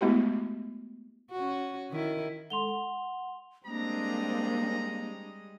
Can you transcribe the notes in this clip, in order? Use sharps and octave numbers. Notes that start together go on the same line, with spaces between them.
G#3 A3 B3 E4 F#4 G4
C#4 F#4
D#3 E4
G#3 A4 F#5 C6 F7 G7
F#5
G3 G#3 A#3 C4 D4 D#5 A#5